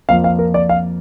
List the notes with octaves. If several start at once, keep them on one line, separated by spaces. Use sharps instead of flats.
F2 F3 A#3 F5
F5
A#4
D5
F5